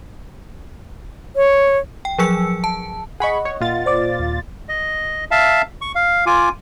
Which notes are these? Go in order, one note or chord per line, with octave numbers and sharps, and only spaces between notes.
C#5
G5
F3 F#3 G#4 E6 C#7
A5
G#4 D#5 F#5 B5 C#6
C#5
A#2 F4 A6
C5 D5 D6
D#2
D#5
E5 F5 A5
C#6
F5
F4 G#5 D6